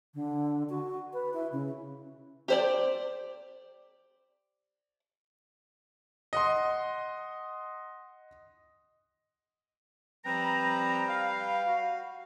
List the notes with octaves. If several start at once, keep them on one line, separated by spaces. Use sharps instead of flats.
D3
F#4
B4
E4
C#3
G4 C5 D5
D#5 F#5 C6
F3 G3 C4 B4 G5 A#5
F5
F#4